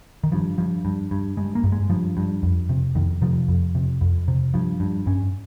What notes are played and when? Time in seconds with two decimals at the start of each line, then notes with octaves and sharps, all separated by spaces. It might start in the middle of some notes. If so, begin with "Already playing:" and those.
0.24 D#3
0.32 G2 F3
0.58 G2 F3
0.85 G2
1.11 G2
1.37 G2 G#3
1.55 A#3
1.64 G2
1.72 G#3
1.90 G2 F3
2.17 G2
2.43 F2
2.69 C3
2.95 F2 D#3
3.22 C3 F3
3.48 F2
3.75 C3
4.01 F2
4.28 C3
4.54 G2 F3
4.80 G2
5.07 G2 C#4